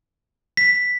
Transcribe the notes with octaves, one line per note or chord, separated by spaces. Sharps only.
B6